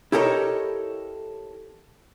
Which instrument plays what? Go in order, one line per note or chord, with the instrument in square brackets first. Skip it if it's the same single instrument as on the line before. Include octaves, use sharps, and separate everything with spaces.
[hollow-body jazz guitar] E4 G4 A4 A#4 C#5 D#5